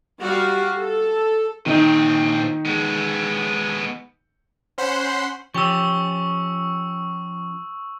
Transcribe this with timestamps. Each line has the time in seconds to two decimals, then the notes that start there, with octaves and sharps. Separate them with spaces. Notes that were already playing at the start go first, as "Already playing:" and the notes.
0.21 G3 F#4 G4 F5
0.78 A4
1.66 A#2 D#3 C4 D#4
2.66 G#3 B3
4.78 C#4 C5 F#5 B5 C6
5.55 F3 C#4 G4 C#6 E6